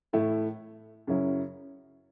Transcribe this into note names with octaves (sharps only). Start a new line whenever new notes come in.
A2 E3 A3 E4
F#2 C#3 F#3 C#4 E4